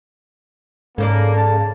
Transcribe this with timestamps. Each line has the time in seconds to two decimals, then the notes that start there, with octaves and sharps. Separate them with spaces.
0.98 G#2 C#3 A#3 A4 C5 D5
1.35 C#3 A5